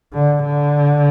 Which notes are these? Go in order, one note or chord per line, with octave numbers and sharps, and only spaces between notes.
D3
D3